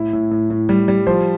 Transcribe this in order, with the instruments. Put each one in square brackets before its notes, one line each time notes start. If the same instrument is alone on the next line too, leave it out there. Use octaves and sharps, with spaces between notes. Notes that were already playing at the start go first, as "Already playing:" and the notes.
Already playing: [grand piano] A2 E4
A2
A2
A2
G3
G3
F3 C5